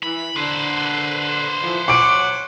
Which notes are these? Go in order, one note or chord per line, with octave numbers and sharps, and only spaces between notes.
E3 B5
D3 B4 C5
E3 F3
F#3 C#5 F#5 D6 D7